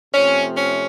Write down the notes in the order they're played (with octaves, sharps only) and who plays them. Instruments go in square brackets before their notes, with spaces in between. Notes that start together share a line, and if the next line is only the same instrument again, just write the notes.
[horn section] C3 F3 A3 C4 C#4
C#4